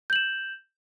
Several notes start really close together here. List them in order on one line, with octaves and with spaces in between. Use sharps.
G6 F#7 E7